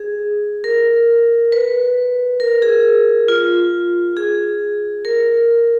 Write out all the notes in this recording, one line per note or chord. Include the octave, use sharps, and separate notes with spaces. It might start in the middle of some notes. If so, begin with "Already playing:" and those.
Already playing: G#4
A#4
B4
A#4
G#4
F4
G#4
A#4